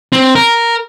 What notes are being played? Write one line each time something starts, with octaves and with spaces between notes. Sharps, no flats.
C4
A#4